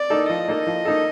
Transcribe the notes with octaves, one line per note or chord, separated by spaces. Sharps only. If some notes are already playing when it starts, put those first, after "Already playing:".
Already playing: D5
A#3 D#4 A4
F3 D#5
A#3 D#4 A4
F3
A#3 D#4 A4